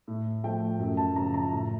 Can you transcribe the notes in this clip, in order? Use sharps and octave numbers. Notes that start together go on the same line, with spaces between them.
A2
F3 A3 G5
F#2
A5
C#3 F3 A#5
A#5
A2